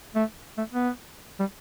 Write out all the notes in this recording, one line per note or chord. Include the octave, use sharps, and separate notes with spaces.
A3
A3
B3
G3